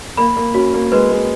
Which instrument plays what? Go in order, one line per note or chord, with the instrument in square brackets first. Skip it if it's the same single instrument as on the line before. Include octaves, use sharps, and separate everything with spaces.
[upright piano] A#3 [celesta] B5
[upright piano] A#3
[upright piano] C#4 [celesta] F#4
[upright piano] A#3
[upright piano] G#3 [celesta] B4
[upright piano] G#3